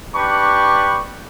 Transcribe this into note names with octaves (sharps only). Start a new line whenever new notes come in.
D4 G4 B4 B5 C#6